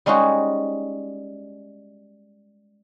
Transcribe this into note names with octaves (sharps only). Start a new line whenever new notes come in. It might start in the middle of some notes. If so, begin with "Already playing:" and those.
G3 G#3 C#4 D#4 F#4